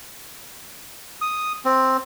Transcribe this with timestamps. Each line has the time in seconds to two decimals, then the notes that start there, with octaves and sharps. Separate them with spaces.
1.21 D#6
1.65 C4